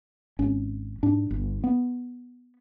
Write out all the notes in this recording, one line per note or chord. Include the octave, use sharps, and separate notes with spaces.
G#1 C#4
G#2 D4
G1
B3